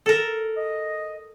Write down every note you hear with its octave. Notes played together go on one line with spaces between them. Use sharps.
A4 A#4
D#5